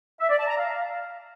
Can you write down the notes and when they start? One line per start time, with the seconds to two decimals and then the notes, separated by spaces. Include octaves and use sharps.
0.20 E5
0.29 D5
0.39 A5
0.48 A#5
0.57 F5